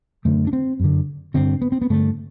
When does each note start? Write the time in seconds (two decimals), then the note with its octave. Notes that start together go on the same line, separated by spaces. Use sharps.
0.25 F#2 D3 A3
0.47 D4
0.53 C4
0.80 F#2 D3
1.34 G2 D3 C4
1.62 B3
1.72 C4
1.82 B3
1.90 G2 D3 A3